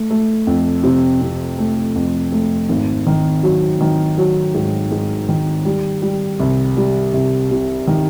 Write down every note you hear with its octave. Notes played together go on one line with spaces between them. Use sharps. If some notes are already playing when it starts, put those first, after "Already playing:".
Already playing: A3
A3
F2
C3
C3
A3
F2
A3
G#1
D#3
F#3
D#3
F#3
G#2
G#2
D#3
G3
G3
C2
G3
C2
C3
D#3